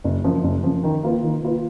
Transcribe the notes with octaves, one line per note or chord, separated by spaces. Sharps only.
F#1
F#2 F3
F#1
F#2 F3
D#3
A#3 F4 B4
D#3
A#3 F4 B4